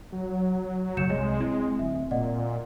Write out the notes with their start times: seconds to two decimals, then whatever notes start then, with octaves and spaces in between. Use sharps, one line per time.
0.12 F#3
0.97 F#1 G6 C#7 E7
1.10 C2 G#3 C#5
1.40 C4 E4
1.79 D1 E5
2.11 A#2 D5 D#5 F#5